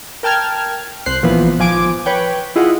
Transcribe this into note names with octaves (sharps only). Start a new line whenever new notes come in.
A#4 G5 A5 F6 G#6
C2 C5 F#6 C7
A#1 A#2 E3 F3 B3 B4
G#1 F3 G#5 D6
B4 C#5 G5
E4 F4 G#4 D#5 F#5